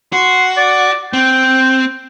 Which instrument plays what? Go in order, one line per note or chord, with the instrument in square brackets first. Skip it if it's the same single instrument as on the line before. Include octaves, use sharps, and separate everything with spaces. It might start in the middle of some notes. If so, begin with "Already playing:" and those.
[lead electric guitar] F#4 [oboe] C6
[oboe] D5
[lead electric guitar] C4 [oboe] G5